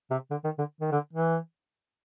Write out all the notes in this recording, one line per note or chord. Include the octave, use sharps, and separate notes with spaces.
C3
D3
D#3
D3
D#3
D3
E3